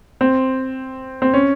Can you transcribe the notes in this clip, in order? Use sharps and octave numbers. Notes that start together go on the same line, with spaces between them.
C4
C4
C#4